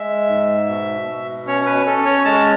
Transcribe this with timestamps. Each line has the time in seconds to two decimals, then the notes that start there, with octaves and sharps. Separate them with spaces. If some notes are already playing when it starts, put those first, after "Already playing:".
Already playing: G#3 E5
0.29 G#2
0.68 B2
1.08 B2
1.47 C#4 C#5
1.66 B4
1.86 C#4 A4
2.05 C#5
2.25 G#3 A5